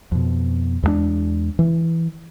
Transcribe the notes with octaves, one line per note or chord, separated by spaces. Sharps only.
F2 B2
E2 G2 G#3 D4
E3